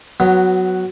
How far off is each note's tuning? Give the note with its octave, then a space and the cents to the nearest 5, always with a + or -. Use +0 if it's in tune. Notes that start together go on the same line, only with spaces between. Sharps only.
F#3 +0 B3 +20 B4 +0